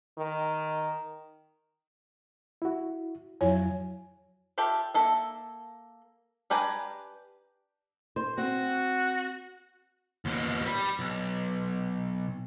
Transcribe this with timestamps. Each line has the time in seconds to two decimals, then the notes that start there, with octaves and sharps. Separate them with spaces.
0.18 D#3
2.62 E4 F#4
3.41 F2 F#3 E4 F4 C#5 G#5
4.58 F4 G4 A4 E5
4.94 A#3 A4 E5
6.50 D4 G4 B4 G#5 A#5
8.16 C5
8.38 C4 F#4
10.25 D#2 B2
10.66 G3 B5
10.99 B1